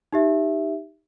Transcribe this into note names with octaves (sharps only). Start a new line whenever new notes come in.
D#4 G4 E5